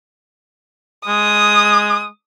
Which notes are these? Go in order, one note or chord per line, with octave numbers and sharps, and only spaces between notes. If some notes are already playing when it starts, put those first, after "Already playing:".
G#3 D#6